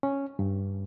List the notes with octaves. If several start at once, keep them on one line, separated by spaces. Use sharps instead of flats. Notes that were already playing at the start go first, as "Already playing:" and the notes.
C#4
G2